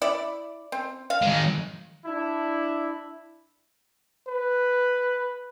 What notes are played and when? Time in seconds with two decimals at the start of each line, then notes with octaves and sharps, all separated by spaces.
0.02 E4 D5
0.72 C4
1.10 F5
1.22 D#3 G#3
2.06 D4 E4
4.28 B4